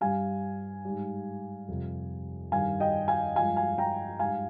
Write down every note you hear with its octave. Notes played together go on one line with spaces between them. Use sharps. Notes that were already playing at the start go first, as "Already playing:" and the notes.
G2 G3 F5 G#5
G#2 G3
F2 C3 G3
G2 D#3 G3 F5 G#5
D#5 G5
F5 G#5
G2 F3 G#3 F5 G#5
F5 G#5
G5 A#5
G#2 G3 F5 G#5